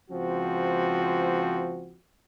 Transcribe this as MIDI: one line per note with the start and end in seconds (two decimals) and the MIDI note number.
0.11 1.98 37
0.11 1.98 53
0.11 1.98 60
0.11 1.98 66